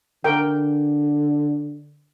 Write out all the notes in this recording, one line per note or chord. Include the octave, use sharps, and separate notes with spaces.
D3 A#4 G5